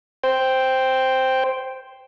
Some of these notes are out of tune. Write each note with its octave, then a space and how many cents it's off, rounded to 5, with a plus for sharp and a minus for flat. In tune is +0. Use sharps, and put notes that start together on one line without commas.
C5 +0 G5 +0